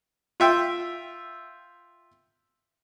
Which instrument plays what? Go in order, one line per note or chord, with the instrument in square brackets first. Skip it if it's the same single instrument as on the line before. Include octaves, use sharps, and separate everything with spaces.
[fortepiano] F4 E5 G5